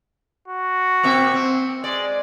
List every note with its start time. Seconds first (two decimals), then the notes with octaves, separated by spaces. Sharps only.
0.48 F#4
1.03 A#2 C4 E5
1.34 C4
1.84 G#3 D5